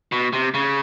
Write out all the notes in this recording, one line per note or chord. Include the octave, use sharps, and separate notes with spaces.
B2
C3
C#3